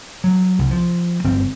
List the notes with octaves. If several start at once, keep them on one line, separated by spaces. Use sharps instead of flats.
F#3
C2
F3
G1 C4